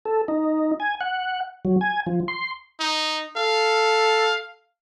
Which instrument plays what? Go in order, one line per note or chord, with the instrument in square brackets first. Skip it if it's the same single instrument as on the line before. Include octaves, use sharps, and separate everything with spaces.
[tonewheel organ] A4
D#4
G#5
F#5
F#3
G#5
F3
C6
[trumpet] D#4
[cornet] A4 [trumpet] F5